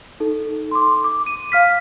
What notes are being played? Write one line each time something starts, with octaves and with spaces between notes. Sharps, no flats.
D#4 A4
C6 D6
D6
D#7
F5 F6 B6